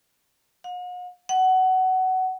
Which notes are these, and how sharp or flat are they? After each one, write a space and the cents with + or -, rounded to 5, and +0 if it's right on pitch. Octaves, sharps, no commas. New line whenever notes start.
F#5 -45
F#5 +20